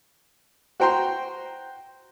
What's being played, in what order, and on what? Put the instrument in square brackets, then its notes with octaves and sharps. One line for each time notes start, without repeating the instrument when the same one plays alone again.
[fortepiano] F#4 C5 G5 A#5 C6